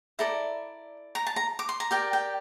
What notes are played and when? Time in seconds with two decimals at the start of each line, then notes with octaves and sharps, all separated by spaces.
0.19 E4 A4 D5 A#5
1.15 A#5
1.27 A5
1.36 A#5
1.59 D6
1.69 C6
1.80 A#5
1.91 G4 A#4 D5 G5
2.13 G5